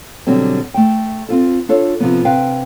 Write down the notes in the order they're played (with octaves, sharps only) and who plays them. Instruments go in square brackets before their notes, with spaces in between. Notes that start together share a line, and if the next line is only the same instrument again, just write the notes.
[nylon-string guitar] B2 D3 F#3 G3 C4
A3 G5
C4 F4 A4
D4 F4 A4 C#5
C3 F3 B3
C3 B4 F5 G5